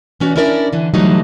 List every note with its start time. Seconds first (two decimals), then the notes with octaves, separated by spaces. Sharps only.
0.20 E3 C#4 F#4 D5
0.36 C#4 D4 E4 A#4 D5
0.73 D3 E3
0.94 D3 E3 F#3 G3 A3 D#4